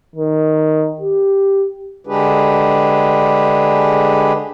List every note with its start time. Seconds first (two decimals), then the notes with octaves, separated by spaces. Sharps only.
0.16 D#3
1.01 G4
2.07 D3 G#3 D4 G4 G#4 B4